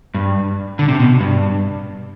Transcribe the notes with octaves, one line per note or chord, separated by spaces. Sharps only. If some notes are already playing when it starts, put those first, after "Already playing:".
G2
D3
C3
B2
G2